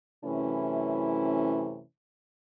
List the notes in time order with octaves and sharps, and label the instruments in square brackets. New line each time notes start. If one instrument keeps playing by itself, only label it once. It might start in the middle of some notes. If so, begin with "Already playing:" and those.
[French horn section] F#2 C3 E3 A3 C#4 E4